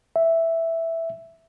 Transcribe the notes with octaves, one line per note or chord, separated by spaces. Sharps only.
E5